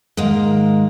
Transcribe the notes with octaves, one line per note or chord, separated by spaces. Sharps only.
G#2 D#3 G#3 A#3